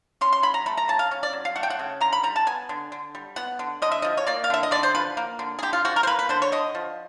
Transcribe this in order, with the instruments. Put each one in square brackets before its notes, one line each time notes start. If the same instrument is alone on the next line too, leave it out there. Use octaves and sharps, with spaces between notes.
[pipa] C#4 C6
C6
F#3 B5
A#5
A3 B5
A#5
C#3 A5
F5
C#4
D5
F#3
F5
A3 F#5
G5
F#5
C#3
D3 A#5
B5
G3 A#5
A5
B3 G#5
D3
D3
G3
B3 F#5
D3
D3 D#5
E5
F3 D#5
C#5
A#3 D5
F5
D3 E5
D#5
D3 D5
C5
F3 B4
A#3
D3
G#4
D3 G4
F4
F3 F#4
A#4
C5
A#3 B4
B4
D3 C5
C#5
D3 D#5
F3